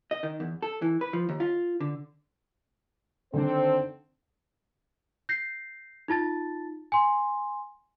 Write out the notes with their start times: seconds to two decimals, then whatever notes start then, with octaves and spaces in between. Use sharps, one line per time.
0.11 D#5
0.23 D#3
0.40 E2
0.62 A4
0.82 E3
1.01 B4
1.13 F3
1.29 D#2
1.40 F4
1.80 D3
3.34 D3 D#3 C4 D4 A4 C5
5.29 G6 A#6 C7
6.08 D#4 F4 A5 A6
6.92 G#5 C6